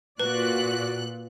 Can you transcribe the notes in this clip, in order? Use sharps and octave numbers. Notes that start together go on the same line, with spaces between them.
A#2 F#4 B4 D5 F#6